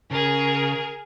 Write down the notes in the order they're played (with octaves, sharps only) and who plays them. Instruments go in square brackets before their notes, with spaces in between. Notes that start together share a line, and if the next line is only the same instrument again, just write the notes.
[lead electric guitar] C#3 [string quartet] G#4 A#4